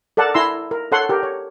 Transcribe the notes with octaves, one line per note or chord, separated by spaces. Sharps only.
A4 A#4 D5 F#5 A5
E4 A#5 C6 E6
A#4
A4 C#5 F#5 C6
G4 A#4
C#5